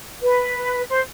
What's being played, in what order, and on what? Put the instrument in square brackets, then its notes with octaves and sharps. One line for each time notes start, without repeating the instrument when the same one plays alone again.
[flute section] B4
C5